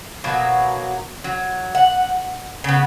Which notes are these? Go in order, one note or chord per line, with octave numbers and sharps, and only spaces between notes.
B2 F#3 A#3
F#3
F#5
C#3 B3